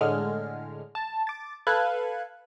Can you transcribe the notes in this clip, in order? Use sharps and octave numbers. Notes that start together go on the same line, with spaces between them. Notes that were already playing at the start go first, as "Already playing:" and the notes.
A2 D3 G#3 F6
A5
D6 A6
A4 B4 F5 F#6 G#6